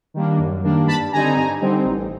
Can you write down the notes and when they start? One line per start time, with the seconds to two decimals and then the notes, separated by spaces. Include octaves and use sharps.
0.14 D#3 G3 A#3 D4
0.39 F#2
0.64 D#3 G3 A#3 D4
0.88 G2 A5 B5
1.12 D3 G3 C4 D#4 G#5 A#5
1.36 G2
1.61 D3 G3 C4 D#4
1.85 A1